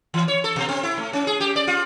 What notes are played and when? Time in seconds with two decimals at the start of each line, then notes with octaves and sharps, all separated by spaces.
0.14 E3
0.28 C#5
0.44 A4
0.56 B2
0.69 C4
0.83 E4
0.98 A3
1.13 C#4
1.27 G#4
1.40 G4
1.56 D5
1.67 F4